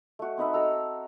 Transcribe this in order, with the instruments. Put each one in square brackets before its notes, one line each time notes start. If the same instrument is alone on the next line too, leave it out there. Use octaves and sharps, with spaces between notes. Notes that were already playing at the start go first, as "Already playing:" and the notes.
[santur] A3 F#4
C4 D#4 B4 E5
F#4 A4 A#5 E6